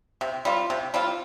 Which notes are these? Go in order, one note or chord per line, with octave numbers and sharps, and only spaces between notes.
C3
G3 C4 F4
C3
G3 C4 F4